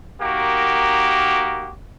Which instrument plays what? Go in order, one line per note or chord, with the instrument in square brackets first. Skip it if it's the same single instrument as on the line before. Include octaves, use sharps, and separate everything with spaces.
[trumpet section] A#3 D#4 F#4 G4 A#4